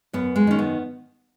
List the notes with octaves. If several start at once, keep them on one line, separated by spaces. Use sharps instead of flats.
F#2 B3
G#3
D#3 C#4
B3